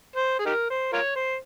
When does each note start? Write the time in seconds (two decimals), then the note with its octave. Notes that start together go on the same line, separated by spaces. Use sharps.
0.16 C5
0.39 G#4
0.46 D#4 G4 A#4
0.70 C5
0.93 F4 A#4 C#5
1.15 C5